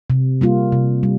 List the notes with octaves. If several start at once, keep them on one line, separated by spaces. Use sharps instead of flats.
C3
G3 A#3 F4
C3
G3